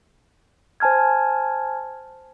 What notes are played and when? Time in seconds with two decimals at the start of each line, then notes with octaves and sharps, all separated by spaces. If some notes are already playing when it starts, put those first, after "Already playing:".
0.80 C5 G#5 A5 F6 G#6